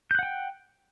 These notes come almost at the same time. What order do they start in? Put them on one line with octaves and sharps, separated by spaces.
G6 F#6 F#5 G5